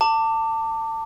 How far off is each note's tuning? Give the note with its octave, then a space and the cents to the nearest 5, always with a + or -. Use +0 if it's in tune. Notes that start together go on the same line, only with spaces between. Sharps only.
A5 +30 D6 +0